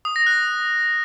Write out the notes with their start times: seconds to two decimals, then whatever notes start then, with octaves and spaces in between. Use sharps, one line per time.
0.05 D#6
0.16 A#6
0.26 F#6